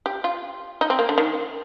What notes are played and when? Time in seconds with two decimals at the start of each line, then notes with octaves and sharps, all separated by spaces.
0.06 G4
0.24 F4
0.81 D#4
0.90 C4
0.99 A#3
1.09 D3
1.18 D#3